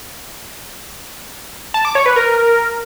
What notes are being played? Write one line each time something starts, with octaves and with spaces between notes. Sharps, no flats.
A5
D6
C#5
B4
A#4